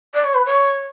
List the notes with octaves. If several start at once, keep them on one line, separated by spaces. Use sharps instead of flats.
D5
C#5
B4
C#5